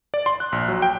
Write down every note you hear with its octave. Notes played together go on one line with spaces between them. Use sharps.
D5
C6
F#6
A#1
F#3
G5